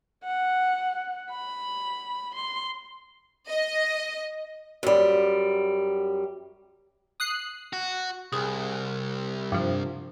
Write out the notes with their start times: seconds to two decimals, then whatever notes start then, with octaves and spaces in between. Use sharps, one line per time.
0.24 F#5
1.30 B5
2.35 C6
3.49 D#5
4.83 F#2 G3
7.20 D#6 F#6 C7
7.73 F#4
8.32 C2 G#4
9.52 G2 F3